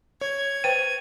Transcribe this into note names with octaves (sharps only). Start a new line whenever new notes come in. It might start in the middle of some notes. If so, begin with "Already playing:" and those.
C#5 G#6
B4 C5 G5 D#7